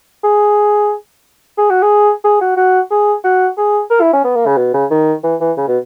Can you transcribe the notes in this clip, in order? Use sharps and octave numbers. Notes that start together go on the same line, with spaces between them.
G#4
G#4
F#4
G#4
G#4
F#4
F#4
G#4
F#4
G#4
A#4
E4
C#4
B3
A#3
C#3
B2
C#3
D#3
E3
E3
C#3
B2